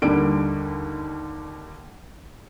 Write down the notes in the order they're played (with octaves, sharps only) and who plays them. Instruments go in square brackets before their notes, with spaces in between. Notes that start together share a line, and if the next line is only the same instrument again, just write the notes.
[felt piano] D#2 D3 G3 D7